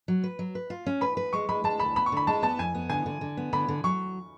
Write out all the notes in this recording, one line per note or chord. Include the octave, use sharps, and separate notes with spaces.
F#3
B4
F#3
B4
F4
C#4
B4 B5
B4
G#3 C#6
G#3 B5
G#3 A5
D2 B5
B3 B5
C#6
D3 B5
G#3 A5
B3 A5
F2 G#5
B3
D3 G#5
D3
D3
B3
D3 B5
D3
F#3 C#6